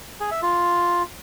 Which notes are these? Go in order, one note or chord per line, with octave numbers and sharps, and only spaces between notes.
G#4
E5
F4